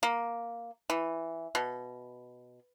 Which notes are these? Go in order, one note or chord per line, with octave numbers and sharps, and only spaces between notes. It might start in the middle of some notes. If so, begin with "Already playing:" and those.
A#3
E3
B2